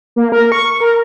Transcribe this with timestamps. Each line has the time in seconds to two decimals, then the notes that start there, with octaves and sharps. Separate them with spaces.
0.16 A#3
0.32 A#4
0.52 C#6
0.80 A#4